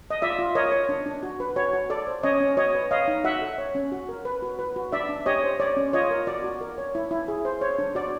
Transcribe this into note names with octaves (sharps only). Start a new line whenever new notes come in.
D#5
F4 D5 E5
F4
A#4 C#5 D#5
C#5
D4
D4
F#4
B4
F#4 C#5
F#4
A4 D5
C5
C#4 C#5 D#5
C#4
F#4 C#5 D#5
B4
C#5 D#5 F5
D#4
F#4 E5 F#5
A4
C#5
C#4
F#4
A#4
B4
F#4
B4
F#4
D4 D5 E5
D4
G4 C#5 D#5
C5
C#5 D5
C#4
F4 C#5 D#5
A#4
F#4 D5
F#4
A#4
C#5
E4
E4
G#4
C5
C5 C#5
D4
F#4 D5